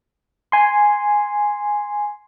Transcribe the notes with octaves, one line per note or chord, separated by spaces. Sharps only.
G#5 C6